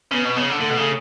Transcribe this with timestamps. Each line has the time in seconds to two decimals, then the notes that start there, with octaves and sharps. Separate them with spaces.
0.11 C#3 B3
0.25 B2
0.36 C#3
0.49 D3
0.61 D3 A3
0.70 B2
0.77 C#3